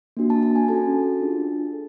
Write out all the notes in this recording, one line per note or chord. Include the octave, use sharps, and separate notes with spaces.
A#3 D4 F#4
A5
A5
G#5
C#4 F#4 A4 A5
D4 F4 G#4
A4